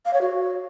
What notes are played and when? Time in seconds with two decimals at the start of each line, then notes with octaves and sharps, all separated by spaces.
0.06 F5
0.13 C#5
0.21 F#4